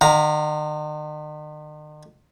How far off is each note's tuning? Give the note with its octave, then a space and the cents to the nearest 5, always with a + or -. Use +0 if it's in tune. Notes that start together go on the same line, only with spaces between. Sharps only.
D#3 -45 F5 +25 A#5 +0